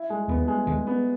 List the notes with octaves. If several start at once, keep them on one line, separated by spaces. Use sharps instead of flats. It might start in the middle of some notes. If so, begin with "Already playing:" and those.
Already playing: E4
G#3
D#2 D#3 B3
G#3
D#2 D#3 G#3
B3